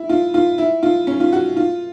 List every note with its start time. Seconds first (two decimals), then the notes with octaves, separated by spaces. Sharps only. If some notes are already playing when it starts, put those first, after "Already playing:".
Already playing: E4
0.09 F4
0.34 F4
0.58 E4
0.83 F4
1.07 C#4
1.20 F4
1.33 F#4
1.57 F4